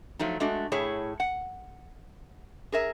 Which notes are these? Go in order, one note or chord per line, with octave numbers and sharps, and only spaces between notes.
F3 F#3 A3 D#4
G#3 A3 D4 F#4
A2 E4 G#4 C#5
F#5
G#4 A#4 E5